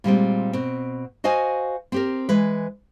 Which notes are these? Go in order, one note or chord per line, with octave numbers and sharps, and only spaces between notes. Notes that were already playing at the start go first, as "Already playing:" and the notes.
A#2 G3 G#3 C4
B2 C4
F#4 C5 D#5 F5 G#5
C4 G4 A#4
E3 G#3 B4